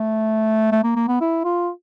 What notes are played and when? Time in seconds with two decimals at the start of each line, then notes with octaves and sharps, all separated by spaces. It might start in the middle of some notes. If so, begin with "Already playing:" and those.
Already playing: A3
0.72 A3
0.84 A#3
0.96 A#3
1.08 B3
1.21 E4
1.44 F4